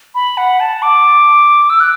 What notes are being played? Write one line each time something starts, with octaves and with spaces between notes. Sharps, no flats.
B5
F#5
A5
D6
E6
F#6